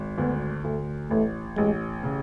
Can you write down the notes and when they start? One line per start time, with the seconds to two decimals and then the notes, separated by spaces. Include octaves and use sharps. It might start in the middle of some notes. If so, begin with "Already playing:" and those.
Already playing: G#1
0.18 D2 B3
0.64 D2 A3
1.10 A1 A3
1.57 A1 G#3
2.03 C#3